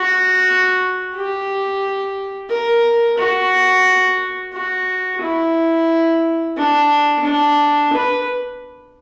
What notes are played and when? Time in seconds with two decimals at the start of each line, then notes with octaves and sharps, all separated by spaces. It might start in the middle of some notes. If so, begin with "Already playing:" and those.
Already playing: F#4
1.15 G4
2.50 A#4
3.18 F#4
4.53 F#4
5.22 E4
6.57 D4
7.25 D4
7.93 B4